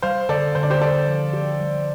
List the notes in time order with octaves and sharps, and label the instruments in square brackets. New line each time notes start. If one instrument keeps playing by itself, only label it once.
[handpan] G3 [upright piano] C5 F5
[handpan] D3 [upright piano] A4 D5
[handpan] D3 [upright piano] C5
[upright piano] D5
G4 C5
[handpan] G4 [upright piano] A4 D5
[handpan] F3
G4
G3